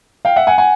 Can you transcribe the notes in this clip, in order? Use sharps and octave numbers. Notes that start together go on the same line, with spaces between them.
F5 G5
E5 F#5
F#5 G#5
F#5 G#5